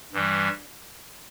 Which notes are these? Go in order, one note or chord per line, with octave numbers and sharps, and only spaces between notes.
G2 E3 G3